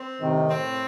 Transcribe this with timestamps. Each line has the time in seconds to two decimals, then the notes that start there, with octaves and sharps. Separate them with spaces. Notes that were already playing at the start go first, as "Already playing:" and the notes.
Already playing: C4
0.21 A2 C3 D#3
0.50 C4